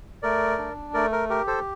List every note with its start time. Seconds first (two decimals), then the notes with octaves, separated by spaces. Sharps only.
0.23 A3 A#4 D5
0.58 D4
0.94 A3 A#4 D5
1.12 A#4
1.29 G4 A#4
1.47 A4 C5